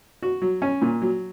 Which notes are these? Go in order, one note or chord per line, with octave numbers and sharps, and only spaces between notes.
F#4
F#3
C#4
A#2
F#3